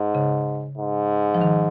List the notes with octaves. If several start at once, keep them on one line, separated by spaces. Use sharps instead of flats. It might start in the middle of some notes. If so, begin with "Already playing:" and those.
Already playing: G#2
C#3
G#2
F3
D#3